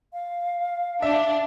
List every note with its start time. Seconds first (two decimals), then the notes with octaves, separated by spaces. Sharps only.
0.13 F5
1.02 D4 E5